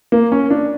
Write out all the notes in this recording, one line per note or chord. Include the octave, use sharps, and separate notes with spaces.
A#3
C#4
D4